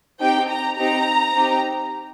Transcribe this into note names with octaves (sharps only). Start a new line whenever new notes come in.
C4 D#4 G4 G5
A#5
C4 D#4 G4 A#5
C4 D#4 G4